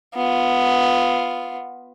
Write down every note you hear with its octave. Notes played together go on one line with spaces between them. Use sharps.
B3 F4